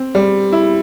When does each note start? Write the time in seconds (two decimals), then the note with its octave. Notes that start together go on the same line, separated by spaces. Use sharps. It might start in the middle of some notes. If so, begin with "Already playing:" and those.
Already playing: C4
0.15 G3
0.52 E4